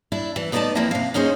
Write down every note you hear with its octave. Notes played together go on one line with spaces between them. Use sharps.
D4 E4
E3
A2 B3 D#4 F#4 D5 A5
E2 F3 A#3 C4 E4
C3 F5
A#3 C#4 D#4 G#4 C5